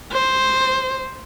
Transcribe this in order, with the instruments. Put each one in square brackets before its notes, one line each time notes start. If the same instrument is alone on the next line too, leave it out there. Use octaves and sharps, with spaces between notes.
[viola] C5